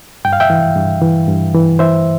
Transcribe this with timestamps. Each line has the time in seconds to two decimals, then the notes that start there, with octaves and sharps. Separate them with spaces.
0.25 G2 G5
0.33 F5
0.40 E5 G5
0.50 E3
0.76 G2
1.02 E3
1.28 G2
1.54 E3
1.79 E3 C5 E5